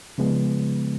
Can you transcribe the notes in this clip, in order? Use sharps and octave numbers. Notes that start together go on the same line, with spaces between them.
C#3 F3 G#3 B3